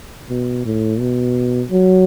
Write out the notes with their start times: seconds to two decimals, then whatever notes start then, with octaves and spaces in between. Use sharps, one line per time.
0.30 B2
0.65 A2
1.00 B2
1.70 F#3